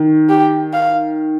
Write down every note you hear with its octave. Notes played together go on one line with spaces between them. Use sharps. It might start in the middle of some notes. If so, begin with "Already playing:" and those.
Already playing: D#3
G4
F5